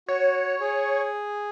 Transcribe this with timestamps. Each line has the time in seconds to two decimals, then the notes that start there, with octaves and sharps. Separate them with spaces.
0.08 F#4 C#5
0.60 G#4